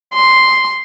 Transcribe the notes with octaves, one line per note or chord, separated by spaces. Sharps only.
C6